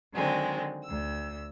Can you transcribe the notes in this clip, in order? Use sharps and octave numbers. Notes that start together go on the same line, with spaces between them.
D3 D#3 F#3 G#3 C4
D2 E6